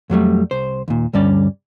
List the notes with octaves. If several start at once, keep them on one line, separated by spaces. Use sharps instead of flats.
F2 F#3 G3 A3
C2 C5
D#2 A#2
D2 G2 G3 C#4 D5